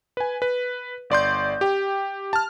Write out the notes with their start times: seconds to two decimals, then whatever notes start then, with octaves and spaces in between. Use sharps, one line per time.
0.17 B4 G#5
0.42 B4
1.10 G1 D5 C6 G6
1.61 G4 G5
2.33 A5 F6